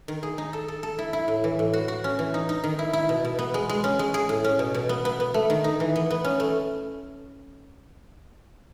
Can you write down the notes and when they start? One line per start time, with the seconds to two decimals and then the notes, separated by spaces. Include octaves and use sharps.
0.08 D#3
0.23 G#4
0.38 D#4
0.53 A4
0.68 A4
0.83 A4
0.99 E4
1.13 E4
1.28 A2
1.44 E3
1.59 A2
1.73 F#4
1.88 F#4
2.04 C#4
2.19 E3
2.34 D#4
2.49 D#4
2.64 D#3
2.79 E4
2.93 E4
3.09 B2
3.25 B2
3.39 B3
3.54 G#3
3.69 G#3
3.84 C#4
3.99 G#3
4.14 G#4
4.29 A2
4.44 C#4
4.59 B2
4.74 B2
4.89 B3
5.05 B3
5.20 B3
5.34 A3
5.50 D#3
5.64 D#4
5.80 E3
5.96 B3
6.11 B3
6.24 C#4
6.40 A3